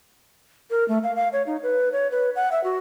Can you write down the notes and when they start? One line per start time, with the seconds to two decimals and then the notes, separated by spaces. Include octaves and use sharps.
0.70 A#4
0.88 A3
1.04 F5
1.16 F5
1.33 C#5
1.47 D#4
1.63 B4
1.92 C#5
2.11 B4
2.36 F#5
2.52 E5
2.64 F#4